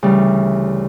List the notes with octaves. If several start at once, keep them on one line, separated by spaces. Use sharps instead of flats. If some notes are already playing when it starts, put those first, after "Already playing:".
D2 C#3 E3 G3